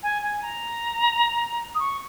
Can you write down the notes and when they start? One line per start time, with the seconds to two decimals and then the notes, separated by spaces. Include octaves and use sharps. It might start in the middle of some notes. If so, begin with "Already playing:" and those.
0.03 G#5
0.22 G#5
0.42 A#5
1.75 D#6
1.79 C#6